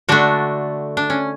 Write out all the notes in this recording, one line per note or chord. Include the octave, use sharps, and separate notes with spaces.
D3 A3 D4 F#4
D4
C#4